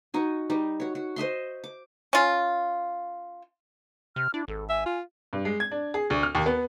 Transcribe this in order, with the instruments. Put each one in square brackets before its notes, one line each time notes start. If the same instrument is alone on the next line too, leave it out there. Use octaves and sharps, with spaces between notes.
[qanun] D#4 F#4 G#5
G3 D#4
F#4 C#5
F#4
C5 D#5 E5 C6
D6
[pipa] C#4 F4
[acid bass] C3 [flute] F6
[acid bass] D4 [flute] E4
[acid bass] G#1 [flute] A4
[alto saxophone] E5 [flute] G#5
[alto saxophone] F4
[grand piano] G2
G#3
G#6
D4
G#4
D2
F6
D#2
B3